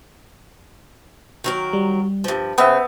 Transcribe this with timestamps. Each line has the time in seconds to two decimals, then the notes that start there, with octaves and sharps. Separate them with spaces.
1.44 D#3 F#3 A#4
1.73 G3
2.24 G2 F3
2.58 C#3 B3 C4 E5 G5